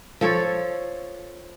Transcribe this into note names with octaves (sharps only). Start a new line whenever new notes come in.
F3 A4 C#5